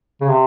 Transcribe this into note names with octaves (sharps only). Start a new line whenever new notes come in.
C#3
C3